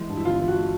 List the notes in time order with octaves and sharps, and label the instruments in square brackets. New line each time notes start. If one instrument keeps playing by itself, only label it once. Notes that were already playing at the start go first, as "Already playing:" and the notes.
Already playing: [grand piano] E3 G#3
G2
[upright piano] E4
[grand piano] G1 [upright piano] F4
[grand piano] E3
[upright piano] F#4
[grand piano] G#3